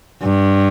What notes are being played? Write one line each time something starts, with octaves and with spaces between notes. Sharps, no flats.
G2